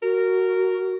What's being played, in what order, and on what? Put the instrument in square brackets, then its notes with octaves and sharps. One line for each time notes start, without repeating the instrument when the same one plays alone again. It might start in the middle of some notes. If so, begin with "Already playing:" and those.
[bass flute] F#4 [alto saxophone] A#4